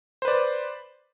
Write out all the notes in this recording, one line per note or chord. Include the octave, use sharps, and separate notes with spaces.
B4 C5 D5